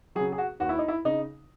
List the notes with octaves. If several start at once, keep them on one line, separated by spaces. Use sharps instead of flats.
C#3 F#3 G#4
G#4
F#4
D#2 F#4
E4
D#4
E4
C#3 D#4